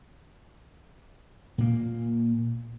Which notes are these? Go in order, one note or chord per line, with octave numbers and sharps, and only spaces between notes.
A#2 A#3